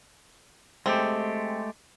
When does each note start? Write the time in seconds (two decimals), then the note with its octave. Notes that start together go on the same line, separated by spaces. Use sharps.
0.86 G#3 A3 C4 G4